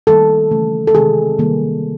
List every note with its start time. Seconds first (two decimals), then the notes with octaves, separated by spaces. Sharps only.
0.07 D#3 G3 A#3 A4
0.51 C#3 E3 A3
0.87 A4
0.94 C3 D#3 G#3 G#4
1.38 C3 D#3 G3 A#3